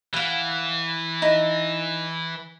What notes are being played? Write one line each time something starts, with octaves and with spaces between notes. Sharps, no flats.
E3 F5 F#5
D#4 E4